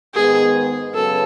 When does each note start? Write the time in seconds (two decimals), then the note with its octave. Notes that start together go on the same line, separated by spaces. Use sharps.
0.15 G#2 D#3 G#3 B3 G#4
0.94 F#2 C#3 F#3 B3 A4